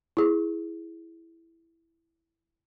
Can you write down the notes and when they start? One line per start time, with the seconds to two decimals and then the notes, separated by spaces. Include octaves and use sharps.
0.17 E4 G#4